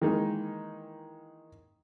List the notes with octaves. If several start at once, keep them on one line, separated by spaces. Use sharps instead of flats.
D#3 E3 G#3 A#3 D#4